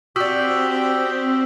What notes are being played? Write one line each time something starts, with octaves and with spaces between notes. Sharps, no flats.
C4 D4 F#4 G4 D#6 E6 B6